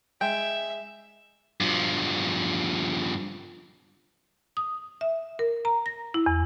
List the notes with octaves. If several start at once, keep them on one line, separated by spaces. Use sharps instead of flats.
G#3 E5 G5
G2 F3
D#6
E5
A#4
A#5
A#6
E4
E2